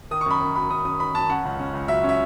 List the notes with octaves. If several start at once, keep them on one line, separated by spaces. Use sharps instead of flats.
D#3 D#6
C#6
F#2 B5
F#2
F#3 B5
F#2 D#6
F#2 D#6
D#3 B5
F#2 A5
C#4 F#5
C#2
C#4
C#2
F#3 E5
C#4
E5